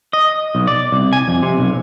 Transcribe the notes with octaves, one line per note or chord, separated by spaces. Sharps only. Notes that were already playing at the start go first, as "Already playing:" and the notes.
D#5
B1
D5
C2
G#5
F2
C3
B1